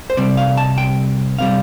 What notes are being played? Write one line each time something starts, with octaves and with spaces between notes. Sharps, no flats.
C5
C2 C3 G3 D5
F5
A5
G5
C3 G3 F5